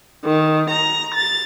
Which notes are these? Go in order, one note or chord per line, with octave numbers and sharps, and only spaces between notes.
D#3
A#5
A6